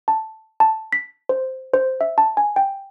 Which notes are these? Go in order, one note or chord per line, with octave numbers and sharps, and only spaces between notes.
A5
A5
B6
C5
C5
E5
A5
G#5
G5